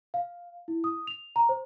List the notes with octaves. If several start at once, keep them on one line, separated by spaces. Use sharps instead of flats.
F5
E4
D#6
F7
A#5
C5